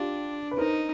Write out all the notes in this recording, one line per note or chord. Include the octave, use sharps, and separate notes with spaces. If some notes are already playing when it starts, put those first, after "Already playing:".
Already playing: D4 F4 G4
B4
D#4 A#4 C5